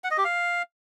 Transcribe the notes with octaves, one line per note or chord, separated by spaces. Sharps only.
F#5
D#5
G4
F5